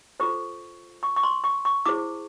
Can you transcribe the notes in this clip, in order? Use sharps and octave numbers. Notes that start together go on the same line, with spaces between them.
F4 A4 C5 C#6
C#6
C#6
C6
C#6
C#6
E4 G#4 C5 D6